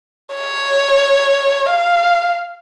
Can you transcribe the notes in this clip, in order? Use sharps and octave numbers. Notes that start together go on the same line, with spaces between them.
C#5
F5